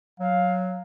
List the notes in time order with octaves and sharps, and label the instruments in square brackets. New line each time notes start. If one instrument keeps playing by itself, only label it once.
[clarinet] F#3 [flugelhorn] F5